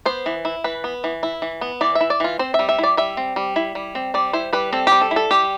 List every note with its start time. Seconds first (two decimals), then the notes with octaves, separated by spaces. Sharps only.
0.06 B3 C5
0.26 E3
0.45 E4
0.64 E3 B4
0.84 B3
1.04 E3
1.23 E4
1.42 E3
1.61 B3
1.81 E3 D5
1.95 E5
2.01 E4
2.10 D5
2.20 E3 F4
2.39 C4 C5
2.54 E5
2.59 G3
2.69 E5
2.78 E4
2.83 D5
2.97 G3 E5
3.17 C4
3.36 G3
3.56 E4
3.75 G3
3.95 C4
4.14 G3 D5
4.33 E4 C5
4.53 G3 B4
4.73 C4 A4
4.87 G3 G4
5.01 A4
5.11 E4
5.16 A4
5.31 G3 G4